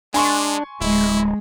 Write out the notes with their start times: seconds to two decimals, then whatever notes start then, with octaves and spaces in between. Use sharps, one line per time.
0.14 G#3 D4 G#5 C6 C#6
0.81 D1 G#3 E4